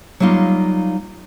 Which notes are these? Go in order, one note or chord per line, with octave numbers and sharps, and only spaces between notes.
F#3 G3 A#3 D#4 F4